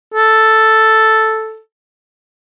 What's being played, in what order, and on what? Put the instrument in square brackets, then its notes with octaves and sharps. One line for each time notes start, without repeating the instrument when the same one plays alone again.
[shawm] A4